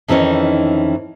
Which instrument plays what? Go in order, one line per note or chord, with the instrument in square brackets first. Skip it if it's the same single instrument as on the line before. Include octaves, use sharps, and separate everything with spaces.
[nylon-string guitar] F2 D#3 E3 A3 C#4 D#4